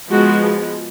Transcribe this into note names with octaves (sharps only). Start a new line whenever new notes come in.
F3 G#3 B3 F#4